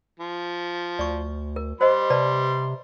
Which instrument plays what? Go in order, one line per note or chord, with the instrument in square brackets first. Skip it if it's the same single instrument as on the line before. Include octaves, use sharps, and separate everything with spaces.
[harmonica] F3
[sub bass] D2 [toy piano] D5 C#6
[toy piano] A#4
[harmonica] G3 C6 [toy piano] C5 D#5
[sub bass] C3 [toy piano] B4 D5 A5